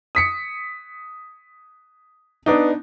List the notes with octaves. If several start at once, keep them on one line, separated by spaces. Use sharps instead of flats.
D#6 B6 C#7
B3 D4 D#4